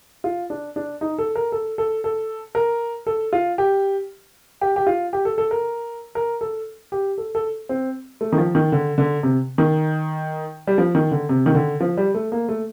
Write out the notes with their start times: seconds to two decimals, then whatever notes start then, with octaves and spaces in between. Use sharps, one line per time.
0.24 F4
0.50 D4
0.76 D4
1.01 D#4
1.18 A4
1.35 A#4
1.52 A4
1.78 A4
2.04 A4
2.55 A#4
3.07 A4
3.33 F4
3.58 G4
4.61 G4
4.76 G4
4.87 F4
5.13 G4
5.25 A4
5.38 A4
5.51 A#4
6.15 A#4
6.41 A4
6.92 G4
7.18 A4
7.35 A4
7.69 C4
8.21 A3
8.32 D#3
8.38 F3
8.55 D#3
8.72 D3
8.98 D3
9.23 C3
9.58 D#3
10.67 G3
10.78 F3
10.95 D#3
11.11 D3
11.29 C3
11.46 D#3
11.55 D3
11.80 F3
11.97 G3
12.15 A3
12.32 A#3
12.49 A3